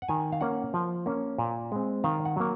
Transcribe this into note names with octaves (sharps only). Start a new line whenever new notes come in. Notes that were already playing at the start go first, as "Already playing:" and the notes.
F#5
D#3 G#5
F5
A#3 C#4 F#5
F3
A#3 C#4
A#2
G#3 C4
D#3 F5
F#5
F#3 A#3